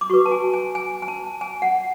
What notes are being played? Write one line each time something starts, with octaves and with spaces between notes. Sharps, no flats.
D6
F#4 B4 C#6
A5
G#5
G#5
G#5
G#5
A5
G#5
F#5